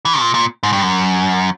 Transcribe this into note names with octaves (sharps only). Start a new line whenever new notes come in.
E3
A#2
A#2
G#2
G2
F#2